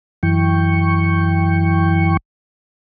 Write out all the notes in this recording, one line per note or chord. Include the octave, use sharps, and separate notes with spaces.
F#2 E3 G5 C#6